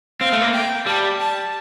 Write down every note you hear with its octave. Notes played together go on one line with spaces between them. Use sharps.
C4 F5
A3
A#3
G5
G3 A5
A5